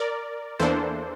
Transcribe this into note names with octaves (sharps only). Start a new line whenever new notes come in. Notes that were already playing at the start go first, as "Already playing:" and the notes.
Already playing: A#4 D5
E2 E3 A#3 D4 A4 C5